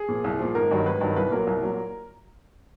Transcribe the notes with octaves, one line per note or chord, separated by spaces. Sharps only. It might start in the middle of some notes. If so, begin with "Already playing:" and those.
Already playing: G#4
A#2 F3
C2
A#2 F3
G#1 A#4
G2 D#3 F#3
G#1 B4
G2 D#3 F#3
C2 B4
A#2 F#3 A#4
C2
A#2 F#3